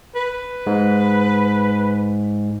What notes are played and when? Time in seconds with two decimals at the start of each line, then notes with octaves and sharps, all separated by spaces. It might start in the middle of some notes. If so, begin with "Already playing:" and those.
0.15 B4
0.67 G#2